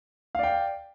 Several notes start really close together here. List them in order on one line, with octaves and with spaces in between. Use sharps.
F5 D5 G5